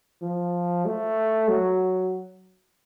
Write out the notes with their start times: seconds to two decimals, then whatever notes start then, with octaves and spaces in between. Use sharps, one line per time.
0.22 F3
0.86 A3
1.48 F#3